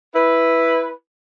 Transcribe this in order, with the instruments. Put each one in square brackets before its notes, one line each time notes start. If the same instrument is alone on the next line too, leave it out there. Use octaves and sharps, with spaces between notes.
[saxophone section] E4 B4